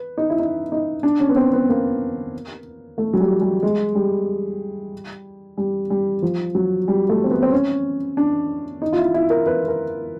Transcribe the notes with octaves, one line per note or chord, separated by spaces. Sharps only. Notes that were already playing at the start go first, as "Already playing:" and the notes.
Already playing: B4
D#4
E4
D#4
D#4
D4
C#4
B3
C4
B3
A#3
A3
F#3
G3
G3
G#3
G3
G3
G3
F3
F#3
G3
A3
C4
B3
C4
C#4
D4
D#4
F4
E4
E4
A#4
B4
A#4